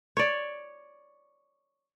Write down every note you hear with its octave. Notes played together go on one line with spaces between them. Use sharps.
C#5 D5